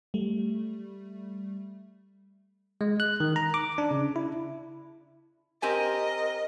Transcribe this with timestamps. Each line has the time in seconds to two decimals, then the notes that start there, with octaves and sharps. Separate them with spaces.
0.14 G3 A3
2.81 G#3
3.00 F#6
3.20 D#3
3.36 A#5
3.54 D6
3.78 D4
3.91 C#3
4.16 E4
5.62 C4 G4 A#4 D#5 G#5